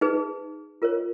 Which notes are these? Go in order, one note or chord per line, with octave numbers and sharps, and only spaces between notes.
D#4 G#4 B4
F4 A#4 C#5